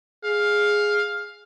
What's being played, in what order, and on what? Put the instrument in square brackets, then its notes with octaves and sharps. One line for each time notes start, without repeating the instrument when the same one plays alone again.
[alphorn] G#4 [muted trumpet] F5